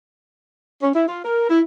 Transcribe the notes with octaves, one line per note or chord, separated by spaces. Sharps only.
C#4
E4
F4
A#4
E4